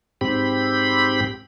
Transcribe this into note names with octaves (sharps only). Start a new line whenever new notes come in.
G#2 C4 G4 B5